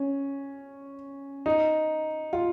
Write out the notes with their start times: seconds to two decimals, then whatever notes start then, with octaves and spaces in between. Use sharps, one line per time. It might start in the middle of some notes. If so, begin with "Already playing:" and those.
Already playing: C#4
1.46 D#4
2.33 F4